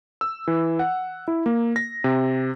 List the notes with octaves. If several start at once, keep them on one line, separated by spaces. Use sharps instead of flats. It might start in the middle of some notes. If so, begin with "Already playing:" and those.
E6
E3
F#5
E4
A#3
A#6
C3